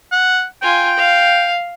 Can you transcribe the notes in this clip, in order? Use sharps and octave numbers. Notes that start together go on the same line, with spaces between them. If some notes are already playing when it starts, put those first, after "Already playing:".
F#5
F4 G5 G#5
F5